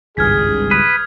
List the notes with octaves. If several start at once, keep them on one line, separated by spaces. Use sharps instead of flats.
G#1 C#2 G2 G#4 F6 G#6 B6
B4 D#6